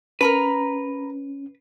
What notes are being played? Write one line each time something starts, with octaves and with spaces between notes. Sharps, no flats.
C#4 A#4 B4 A#5 B5